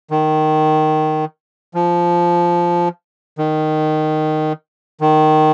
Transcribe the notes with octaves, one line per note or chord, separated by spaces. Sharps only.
D#3
F3
D#3
D#3